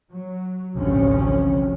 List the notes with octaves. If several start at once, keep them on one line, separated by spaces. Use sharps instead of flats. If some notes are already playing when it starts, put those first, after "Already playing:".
F#3
A1 D2 G2 C3 F3 C#4